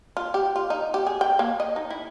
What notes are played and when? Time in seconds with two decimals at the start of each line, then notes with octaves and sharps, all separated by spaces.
0.17 F4
0.34 G4
0.56 F4
0.70 D#4
0.94 G4
1.07 G#4
1.21 G5
1.39 A#3
1.60 D#5
1.76 D#4
1.90 E4